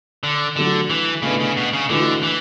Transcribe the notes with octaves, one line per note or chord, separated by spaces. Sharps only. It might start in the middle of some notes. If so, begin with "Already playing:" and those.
D3
D3 F#3 A3 D4
E3
A2 C#3 G#3 B3 D4
C#3
B2
C#3
A2 D3 E3 G#3 D4 F#4
E3